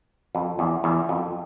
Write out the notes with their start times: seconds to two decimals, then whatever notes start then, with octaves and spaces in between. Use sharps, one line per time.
0.35 F2
0.59 E2
0.84 E2
1.09 F2